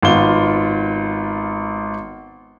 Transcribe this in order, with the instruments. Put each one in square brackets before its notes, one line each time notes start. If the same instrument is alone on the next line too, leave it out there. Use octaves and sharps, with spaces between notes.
[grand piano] G#1 B3 F4 G7